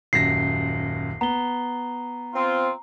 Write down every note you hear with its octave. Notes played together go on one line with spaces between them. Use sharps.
D#1 F#2 A#6 C7
B3 A#5 G7
C4 F4